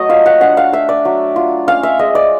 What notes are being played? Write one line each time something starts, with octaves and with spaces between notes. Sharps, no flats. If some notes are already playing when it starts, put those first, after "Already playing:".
Already playing: F#3 A3 D#5
F4 F5
F#5
D4 F#5
F5
A3 E5
D5
F#3
F4
C#4 F5
E5
G#3 D#5
D5